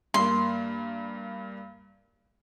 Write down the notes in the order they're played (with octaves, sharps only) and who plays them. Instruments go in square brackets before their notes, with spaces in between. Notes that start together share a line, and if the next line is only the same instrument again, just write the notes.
[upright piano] G2 A#3 [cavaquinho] C6